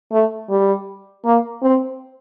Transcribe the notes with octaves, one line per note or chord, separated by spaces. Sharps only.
A3
G3
A#3
C4